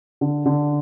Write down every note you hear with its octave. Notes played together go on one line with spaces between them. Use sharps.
D3
D3